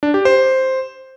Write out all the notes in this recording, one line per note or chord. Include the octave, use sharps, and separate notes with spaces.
D4
G4
C5